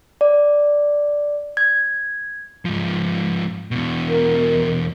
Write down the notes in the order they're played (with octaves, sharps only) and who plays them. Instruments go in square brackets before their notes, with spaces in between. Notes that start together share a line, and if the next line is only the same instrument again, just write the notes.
[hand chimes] D5
G#6
[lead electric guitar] G#2 F3
E2 B2
[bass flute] A#4